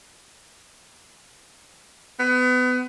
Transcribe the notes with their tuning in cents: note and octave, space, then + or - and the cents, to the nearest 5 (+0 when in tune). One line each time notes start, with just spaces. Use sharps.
B3 +30